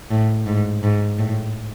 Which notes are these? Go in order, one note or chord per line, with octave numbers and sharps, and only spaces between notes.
A2
G#2
G#2
A2